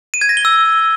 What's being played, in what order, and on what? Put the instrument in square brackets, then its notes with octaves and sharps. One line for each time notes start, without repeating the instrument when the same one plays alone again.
[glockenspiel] D#7
G#6
A#6
G7
E6